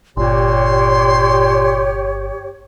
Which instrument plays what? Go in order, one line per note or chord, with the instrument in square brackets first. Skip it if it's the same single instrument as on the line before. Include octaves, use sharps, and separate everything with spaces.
[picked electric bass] G1 [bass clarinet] A#2 [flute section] G4 C#5 [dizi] C6